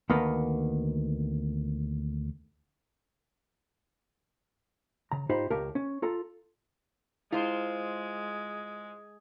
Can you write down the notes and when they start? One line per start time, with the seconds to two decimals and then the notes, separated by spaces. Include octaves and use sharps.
0.10 D2 D#3 A#3 B3
5.12 C#3 A#5
5.29 G#2 D#4 F4 G4 C5 B5
5.50 C#2 G4 A#4 C#5 F5 A5
5.75 C#4
6.02 F4 A4 A#5
7.32 G#3 E4 F4 C5